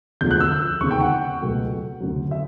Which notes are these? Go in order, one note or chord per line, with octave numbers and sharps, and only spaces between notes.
E1 D2 D3 F3 G6
F#6
E6
E1 D#2 C#3 C#6
G5
F#5
C#2 B2 F#3 A3
D2 C#3 F#3
E5